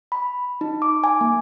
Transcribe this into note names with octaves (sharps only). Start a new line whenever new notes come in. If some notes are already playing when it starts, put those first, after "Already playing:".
B5
D#4
D6
G#5
A#3